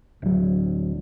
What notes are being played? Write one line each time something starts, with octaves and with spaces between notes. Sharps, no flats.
D1 F#3